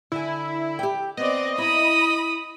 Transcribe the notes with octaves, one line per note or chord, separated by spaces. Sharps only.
D3 E4 G#5
G4 G5
B3 C4 D5 D#5
E4 A#5 B5 D#6